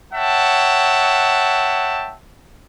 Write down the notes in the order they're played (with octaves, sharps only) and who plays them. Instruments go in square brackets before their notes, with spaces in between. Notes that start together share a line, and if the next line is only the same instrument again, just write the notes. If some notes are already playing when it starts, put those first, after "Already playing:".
[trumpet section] C#5 E5 F#5 G5 A5